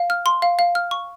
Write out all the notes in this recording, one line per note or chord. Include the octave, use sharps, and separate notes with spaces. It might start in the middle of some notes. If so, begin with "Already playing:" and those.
Already playing: F5
F6
C6
F5
F5
F6
C#6